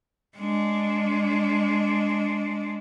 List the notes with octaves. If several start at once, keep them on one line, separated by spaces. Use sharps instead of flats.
G#3 D4